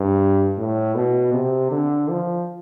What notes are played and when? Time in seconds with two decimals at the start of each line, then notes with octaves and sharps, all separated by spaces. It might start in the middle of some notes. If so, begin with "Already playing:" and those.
Already playing: G2
0.58 A2
0.95 B2
1.34 C3
1.72 D3
2.09 F3